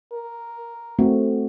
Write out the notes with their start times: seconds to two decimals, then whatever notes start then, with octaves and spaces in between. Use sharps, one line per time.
0.13 A#4
0.99 A3 C4 F#4